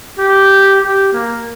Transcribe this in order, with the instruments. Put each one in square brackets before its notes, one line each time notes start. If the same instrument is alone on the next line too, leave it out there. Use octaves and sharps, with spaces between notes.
[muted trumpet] G4
G4
A#3